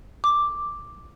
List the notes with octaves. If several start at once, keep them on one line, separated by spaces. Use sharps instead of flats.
D6